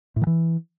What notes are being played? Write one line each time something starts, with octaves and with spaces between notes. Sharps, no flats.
A2
D#3
E3